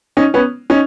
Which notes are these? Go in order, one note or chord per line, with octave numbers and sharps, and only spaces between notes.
C#4 D#4
B3 C#4
C#4 D#4